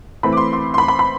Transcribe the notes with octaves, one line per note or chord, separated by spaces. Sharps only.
E3 A3 C4 B5
D6
C6
C6
C6
B5
B5
B5